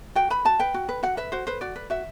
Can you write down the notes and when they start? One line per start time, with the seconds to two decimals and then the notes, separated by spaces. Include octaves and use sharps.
0.15 F#4 G5
0.30 B4 B5
0.45 F#4 A5
0.59 B4 G5
0.74 F#4
0.89 B4
1.03 F#4 F#5
1.17 B4 E5
1.32 F#4 C5
1.47 B4 C5
1.61 F#4 D5
1.76 B4
1.90 F#4 E5